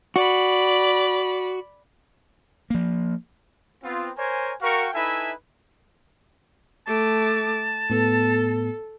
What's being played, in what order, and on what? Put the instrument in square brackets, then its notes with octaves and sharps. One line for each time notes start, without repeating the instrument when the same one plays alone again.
[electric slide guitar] F#4 [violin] D5 B5
[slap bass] F3 A#3
[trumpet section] B3 C4 F4
A#4 C5 C#5 G#5
F#4 A#4 F5 G5 C#6
D#4 E4 A4 B4 E5 G#5
[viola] A3 D6 [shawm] A5
[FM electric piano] A2 B3 [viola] A4